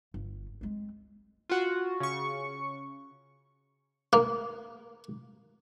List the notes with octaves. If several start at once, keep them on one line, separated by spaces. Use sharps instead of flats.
G1
G#3 C4
F4 F#4
C#3 C#6
A#3